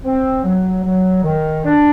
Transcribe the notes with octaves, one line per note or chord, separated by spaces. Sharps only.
C4
F#3
F#3
D#3
D4